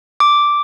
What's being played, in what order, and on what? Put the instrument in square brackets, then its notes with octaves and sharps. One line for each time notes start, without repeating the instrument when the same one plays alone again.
[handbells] D6